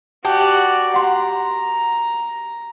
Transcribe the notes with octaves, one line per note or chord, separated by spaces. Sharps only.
F#4 G4 D5 G5 A5
F#5 A#5 C6